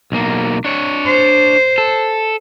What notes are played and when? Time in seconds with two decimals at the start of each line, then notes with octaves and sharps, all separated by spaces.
0.12 B1 A#3
0.65 D4 C#5
1.06 C5
1.78 A4